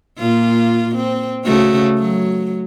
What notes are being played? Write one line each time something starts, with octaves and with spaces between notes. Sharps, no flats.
A#2 F4
C4
C#3 A3 F#4
F#3